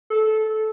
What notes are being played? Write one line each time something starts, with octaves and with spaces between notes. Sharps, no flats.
A4